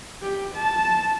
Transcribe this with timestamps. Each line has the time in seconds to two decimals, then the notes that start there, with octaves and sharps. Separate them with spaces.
0.23 G4
0.55 A5